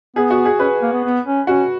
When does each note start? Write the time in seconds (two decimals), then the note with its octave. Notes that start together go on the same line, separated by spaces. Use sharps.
0.16 B3 G#4
0.30 F#4
0.45 G#4
0.59 C#4 B4
0.82 A#3
0.93 B3
1.04 B3
1.26 C#4
1.47 C#4 F#4